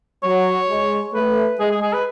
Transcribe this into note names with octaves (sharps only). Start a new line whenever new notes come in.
F#3 C#5
G#3
A3 B4
G#3 G#4
G#4
G#4
B4